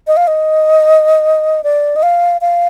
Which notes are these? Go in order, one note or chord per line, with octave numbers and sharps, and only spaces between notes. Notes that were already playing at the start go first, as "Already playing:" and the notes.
D#5
F5
D#5
D5
D#5
F5
F5